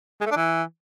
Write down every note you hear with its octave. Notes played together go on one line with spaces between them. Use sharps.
G#3
A3
D4
E3